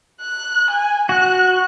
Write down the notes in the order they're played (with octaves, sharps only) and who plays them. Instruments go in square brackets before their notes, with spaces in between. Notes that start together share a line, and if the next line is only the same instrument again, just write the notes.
[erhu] F#6
G#5
[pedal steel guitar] F#4 [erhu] F#6